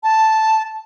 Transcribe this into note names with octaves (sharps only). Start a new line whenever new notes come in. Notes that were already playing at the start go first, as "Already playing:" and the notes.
A5